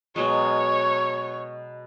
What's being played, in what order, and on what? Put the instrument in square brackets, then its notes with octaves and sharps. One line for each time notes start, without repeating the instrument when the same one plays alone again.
[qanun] B2 F#3 G#3 [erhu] C#5